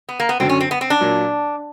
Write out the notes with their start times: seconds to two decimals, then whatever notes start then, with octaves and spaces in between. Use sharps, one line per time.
0.09 B3
0.20 A#3
0.29 B3
0.40 F#2 D3 F#3 C4
0.49 C#4
0.61 C4
0.71 B3
0.81 C4
0.90 D4
1.01 A#2 F#3 A#3